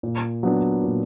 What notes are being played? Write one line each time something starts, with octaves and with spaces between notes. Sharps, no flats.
A#2
F#3 B3 D4
A#2